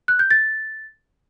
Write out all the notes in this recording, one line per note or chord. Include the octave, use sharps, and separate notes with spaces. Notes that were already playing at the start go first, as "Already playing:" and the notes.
F#6
G6
A6